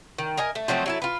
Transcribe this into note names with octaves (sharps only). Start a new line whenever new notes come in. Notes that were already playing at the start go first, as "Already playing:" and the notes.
D#3
A#4 D#5 G#5
A3
F3 F#3 A3 C4
F#3 E4 A4
F4 B4